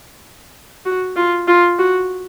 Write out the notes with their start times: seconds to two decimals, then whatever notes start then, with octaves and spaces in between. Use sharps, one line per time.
0.85 F#4
1.16 F4
1.48 F4
1.79 F#4